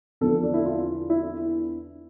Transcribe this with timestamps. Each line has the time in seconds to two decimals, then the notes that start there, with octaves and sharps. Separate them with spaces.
0.21 E2 D3 F3 A4
0.43 D4
0.54 E4
0.65 F4
1.10 E4